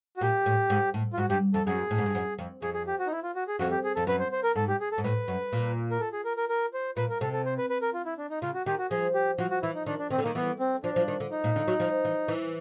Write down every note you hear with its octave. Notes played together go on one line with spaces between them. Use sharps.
F#4
A#2 G4
A2
G#2
A2
F4
G#2 F#4
G2 G4
F2 A4
F#2 G#4
A2
G#2
G2
F#2
F2
F2 G#4
G#4
G4
F#4
D#4
E4
F4
F#4
G#4
F2 F#4
G4
G#4
F2 A4
F#2 B4
C5
C5
A#4
G#2 A4
G4
G#4
A4
G#2
A2 B4
F#2
A#2
A#4
A4
G#4
A#4
A#4
A#4
C5
A#2 B4
A#4
C3 A4
A4
C5
B4
B4
A#4
F4
E4
D4
D#4
C#3 F4
F#4
D#3 G4
F#4
F3 G#4
G4
F3 F#4
F#4
E3 E4
D#4
D#3 D4
D4
D#3 C4
D3
D#3 A#3
E3 B3
C4
F3 D4
F3
D#3
D3
D#4
A#2
D3
F#3
F3
E3
E3